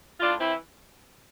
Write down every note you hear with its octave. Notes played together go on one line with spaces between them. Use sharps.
A2 D4 F4
E3 C4 E4